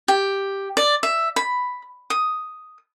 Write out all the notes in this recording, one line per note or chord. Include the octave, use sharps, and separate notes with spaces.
G4
D5
E5
B5
D#6